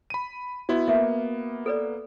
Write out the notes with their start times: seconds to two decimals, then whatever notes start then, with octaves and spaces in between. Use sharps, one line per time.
0.10 B5 D#7
0.69 B3 E4 F#4 D#5
0.88 A#3 B3 E5
1.66 A4 B4 D5